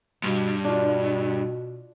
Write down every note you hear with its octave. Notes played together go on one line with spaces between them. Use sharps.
G2 B2 F5
B2 D4 F4